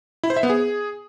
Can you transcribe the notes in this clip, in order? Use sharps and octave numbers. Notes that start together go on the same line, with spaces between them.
E4
C5
E5
B3
G#4